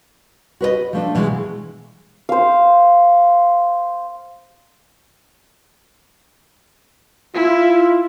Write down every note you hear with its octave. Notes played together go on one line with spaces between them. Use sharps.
F#4 B4 C#5 D#5
F3 A3 D4
B2 E3 G#3
C5 F5
E4 F4